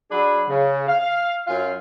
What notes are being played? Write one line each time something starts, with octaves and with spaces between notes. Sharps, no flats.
F#3 D4 G#4 B5
C#3
F5
F#2 F4 F5 G#5